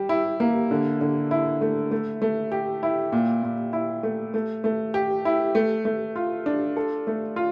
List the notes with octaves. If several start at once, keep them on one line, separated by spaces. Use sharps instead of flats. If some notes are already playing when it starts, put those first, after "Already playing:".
Already playing: G3 G4
E4
A#3
D3
D3
E4
A3
A3
A3
G4
E4
A#2
A#2
E4
A3
A3
A3
G4
E4
A3
A3
F4
D4
A4
A3
F4